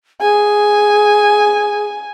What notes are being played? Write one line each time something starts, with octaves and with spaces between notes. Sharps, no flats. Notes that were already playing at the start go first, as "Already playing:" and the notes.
G#4 G#5